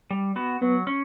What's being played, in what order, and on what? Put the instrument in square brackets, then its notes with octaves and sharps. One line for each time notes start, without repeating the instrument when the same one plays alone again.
[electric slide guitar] G3
B3 F#4
[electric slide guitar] F#3 [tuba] B3
[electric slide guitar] C#4